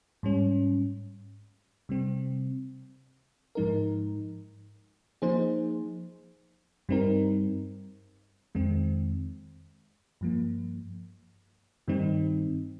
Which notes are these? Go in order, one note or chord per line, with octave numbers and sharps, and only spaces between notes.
G#2 G3 C#4
C3 G3 C4
G#2 F3 G#3 D#4 A#4
F3 A#3 D#4 G#4 C5
G2 G3 C4 D#4 A#4
F2 D#3 G#3 C4
G2 F3 A#3
G2 D#3 G3 C4 D#4